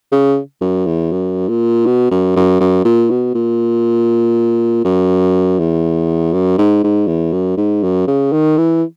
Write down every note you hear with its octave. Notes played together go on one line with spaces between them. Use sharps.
C#3
F#2
E2
F#2
A#2
B2
F#2
F#2
F#2
A#2
B2
A#2
F#2
E2
F#2
G#2
G#2
E2
F#2
G#2
F#2
C#3
D#3
E3